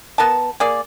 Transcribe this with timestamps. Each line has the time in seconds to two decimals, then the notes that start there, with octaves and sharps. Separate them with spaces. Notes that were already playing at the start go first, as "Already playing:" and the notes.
0.18 B3 A#4 B4 A5
0.60 A#3 G#4 D5